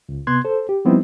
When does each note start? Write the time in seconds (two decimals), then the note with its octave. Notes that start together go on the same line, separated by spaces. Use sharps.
0.09 C#2
0.27 C3 B3 C6 F#6 G#6
0.45 A4 C5
0.69 G4
0.85 F3 G3 B3 C4 D#4 E4